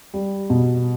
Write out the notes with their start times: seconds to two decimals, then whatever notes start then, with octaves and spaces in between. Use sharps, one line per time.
0.14 G3
0.50 B2